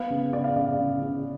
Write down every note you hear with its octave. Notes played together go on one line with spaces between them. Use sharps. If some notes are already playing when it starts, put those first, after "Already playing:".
Already playing: B3 F5
C#3
C#3 D5
F5
C#3 D5
C#3
C#3